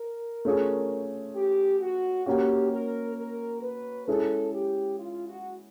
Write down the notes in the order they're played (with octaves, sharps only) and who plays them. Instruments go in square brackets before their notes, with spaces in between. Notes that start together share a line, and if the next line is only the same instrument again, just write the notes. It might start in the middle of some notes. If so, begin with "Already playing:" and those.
Already playing: [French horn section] A#4
[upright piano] A3 C#4 F4 G#4
[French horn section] G4
F#4
[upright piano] A#3 C#4 F#4 [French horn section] G4
[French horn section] A#4
A#4
B4
[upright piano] G#3 C#4 E4 G#4 [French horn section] A4
[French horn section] G4
F4
F#4